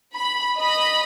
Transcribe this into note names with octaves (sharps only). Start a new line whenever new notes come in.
B5
D#5 B5